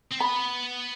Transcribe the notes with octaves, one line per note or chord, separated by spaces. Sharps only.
C4
B3 B5